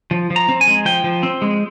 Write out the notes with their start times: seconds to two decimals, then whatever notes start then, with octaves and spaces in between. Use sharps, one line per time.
0.11 F3
0.30 F3
0.36 A#5
0.49 C4
0.61 G#5
0.68 G#3
0.85 F3 G5
1.04 F3
1.23 C4
1.42 G#3